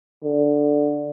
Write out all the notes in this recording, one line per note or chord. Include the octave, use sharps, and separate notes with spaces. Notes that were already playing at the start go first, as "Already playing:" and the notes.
D3